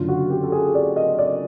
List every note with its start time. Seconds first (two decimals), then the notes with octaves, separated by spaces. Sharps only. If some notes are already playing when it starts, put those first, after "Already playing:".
Already playing: F#1 F#2 D3 F4
0.09 F#4
0.30 G4
0.43 A4
0.52 G#4
0.75 D5
0.96 D#5
1.19 D5